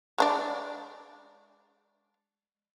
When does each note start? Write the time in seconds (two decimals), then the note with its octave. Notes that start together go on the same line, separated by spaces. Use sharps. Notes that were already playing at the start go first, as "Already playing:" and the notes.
0.18 G#3 D4 D5